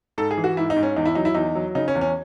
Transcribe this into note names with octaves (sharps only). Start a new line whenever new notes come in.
G#2 A4
G#4
E3
F#4
G#2 E4
D#4
G#2
C#4
E2 D#4
E4
F#3 D#4
E4
E2 D#4
F#3
C#3 D#4
C#4
E2
C#4